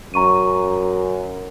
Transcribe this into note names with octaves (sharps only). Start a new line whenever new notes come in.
F#2 A#5 C#6 D#7